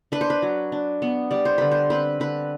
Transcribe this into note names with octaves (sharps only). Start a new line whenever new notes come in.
D4 B4
C5
B4
F#3
D4
B3
G3 D5
C5
D3 B4
C5
C4 B4
D3 B4